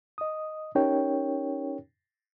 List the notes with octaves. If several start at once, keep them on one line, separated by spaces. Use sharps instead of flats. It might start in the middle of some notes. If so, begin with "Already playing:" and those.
D#5 D#6
C#4 D#4 G4 A#4 C#5 G5